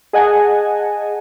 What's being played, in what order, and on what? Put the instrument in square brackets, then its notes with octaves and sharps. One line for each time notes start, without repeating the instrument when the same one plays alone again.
[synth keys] G#4 D#5 F#5 G#5 A5